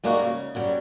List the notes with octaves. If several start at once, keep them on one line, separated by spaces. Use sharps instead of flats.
G3 G#3 A#3 D#4 F#4
C#3
F#2 F#3 G3